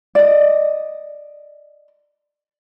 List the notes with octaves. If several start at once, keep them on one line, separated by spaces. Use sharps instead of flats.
D5 D#5